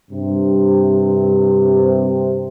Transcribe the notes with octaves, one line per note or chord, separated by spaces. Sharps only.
G2 C3